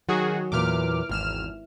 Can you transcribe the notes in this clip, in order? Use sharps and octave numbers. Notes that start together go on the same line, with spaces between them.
D#3 F#3 F#4 G#4
E2 A#2 E3 D6 F6
G#1 E2 F6 E7